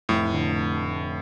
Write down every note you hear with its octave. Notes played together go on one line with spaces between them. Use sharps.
F1 A2
D3